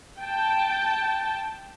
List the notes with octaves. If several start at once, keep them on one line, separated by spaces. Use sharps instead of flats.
G5 A5